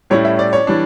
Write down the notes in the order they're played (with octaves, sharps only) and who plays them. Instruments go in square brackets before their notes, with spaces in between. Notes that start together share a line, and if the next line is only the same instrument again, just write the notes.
[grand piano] A2 G3 C#4 E4 [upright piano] C#5
[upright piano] E5
D5
C#5
[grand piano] E3 G3 D4